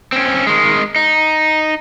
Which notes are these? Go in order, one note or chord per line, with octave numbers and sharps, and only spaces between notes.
C4 C#4
D#3 G#3
D#4